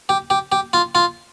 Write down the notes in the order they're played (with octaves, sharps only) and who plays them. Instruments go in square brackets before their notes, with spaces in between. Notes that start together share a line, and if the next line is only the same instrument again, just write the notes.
[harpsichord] G4
G4
G4
F4
F4